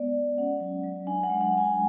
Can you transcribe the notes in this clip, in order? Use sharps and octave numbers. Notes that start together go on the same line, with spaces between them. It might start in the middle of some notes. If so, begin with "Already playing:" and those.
Already playing: G#3 B3 D5
G#3
C#4 F#5
F#3
F#3
D4 G#5
F#5
G#3
F#5
G#3 G#5